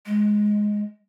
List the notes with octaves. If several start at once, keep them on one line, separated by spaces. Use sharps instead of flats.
G#3